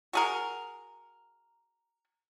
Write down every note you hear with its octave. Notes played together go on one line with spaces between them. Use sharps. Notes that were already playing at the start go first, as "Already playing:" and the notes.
F#4 G#4 A#4